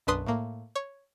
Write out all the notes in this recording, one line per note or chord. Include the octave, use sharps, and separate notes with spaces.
B1 F#2 D4 B4 C6 D#6
A2 A#3
C#5